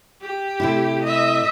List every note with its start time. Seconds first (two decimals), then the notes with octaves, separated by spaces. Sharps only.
0.22 G4
0.60 A2 C3 E4
1.03 D#5 E5